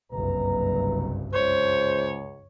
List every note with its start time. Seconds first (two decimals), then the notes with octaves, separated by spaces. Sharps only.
0.12 F#1 C2 G2 B4 A#5
1.33 C#2 C5 C#5